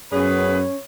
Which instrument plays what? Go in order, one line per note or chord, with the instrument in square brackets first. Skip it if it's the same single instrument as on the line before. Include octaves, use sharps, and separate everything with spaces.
[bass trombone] F#2 [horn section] B3 G#4 B4 [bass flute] C#4 [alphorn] C#5